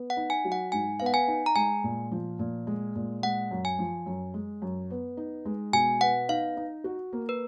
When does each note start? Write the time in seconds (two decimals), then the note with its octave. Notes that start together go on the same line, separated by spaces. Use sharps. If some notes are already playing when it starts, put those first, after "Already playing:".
Already playing: B3
0.10 F#5
0.17 D#4
0.30 G#5
0.44 F#3
0.52 F#5
0.72 G#2 G#5
1.00 B3 F5
1.06 F#5
1.14 G#5
1.28 D#4
1.46 A#5
1.55 G#3 G#5
1.84 A#2
2.11 F3
2.39 A#2
2.67 G#3
2.96 A#2
3.23 G#3 F#5
3.51 F#2
3.65 G#5
3.79 F3
4.06 F#2
4.34 G#3
4.62 F#2
4.90 B3
5.17 D#4
5.45 G#3
5.73 B2 G#5
6.01 B3 F#5
6.29 D#4 F5
6.57 D#4
6.84 F#4
7.13 A#3
7.29 B4